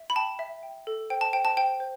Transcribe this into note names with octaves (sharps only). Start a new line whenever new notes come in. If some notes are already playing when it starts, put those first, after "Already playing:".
Already playing: E5
B5
G5 A5
E5
G5
A4
C5 G5
A5
C5 G5
A5
C5 G5
C5